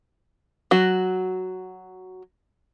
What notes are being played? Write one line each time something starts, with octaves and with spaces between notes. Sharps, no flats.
F#3 F#4